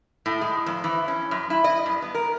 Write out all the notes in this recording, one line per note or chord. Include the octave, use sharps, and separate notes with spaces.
A2
G#3
F2
E3
C#4
F#2
E4
D#5
G2
B3
A#4